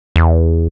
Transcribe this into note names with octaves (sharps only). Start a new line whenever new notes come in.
E2